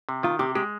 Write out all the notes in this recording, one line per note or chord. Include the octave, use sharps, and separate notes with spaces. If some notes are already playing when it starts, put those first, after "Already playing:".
C3
D#3 F4
C3 G4
G#3 G4